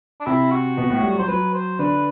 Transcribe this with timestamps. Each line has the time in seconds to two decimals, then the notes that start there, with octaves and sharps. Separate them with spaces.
0.21 D4
0.26 C3 C4 E4
0.51 F#4
0.77 B2 B3
0.90 A2 A3
1.03 G3
1.15 F#3 C5
1.28 F#3 B4
1.54 C5
1.79 D3 D4 B4